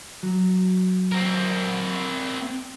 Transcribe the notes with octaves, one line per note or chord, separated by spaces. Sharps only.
F#3
C4 A#4